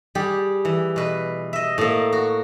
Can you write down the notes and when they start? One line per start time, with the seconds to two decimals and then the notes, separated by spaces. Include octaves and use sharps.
0.15 G3 G4 G#4
0.65 E3
0.96 B2 B4
1.53 D#5 E5
1.78 A2 A#3
2.13 F#4